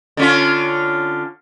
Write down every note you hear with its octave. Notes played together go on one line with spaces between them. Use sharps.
D3 C#4 F4